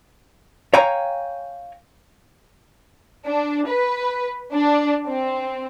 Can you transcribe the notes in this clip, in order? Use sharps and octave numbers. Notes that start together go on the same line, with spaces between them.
C#5 F5 G5 G#5 A#5
D4
B4
D4
C4